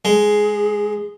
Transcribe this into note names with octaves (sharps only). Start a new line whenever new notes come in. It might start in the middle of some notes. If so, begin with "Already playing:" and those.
G#3 G#4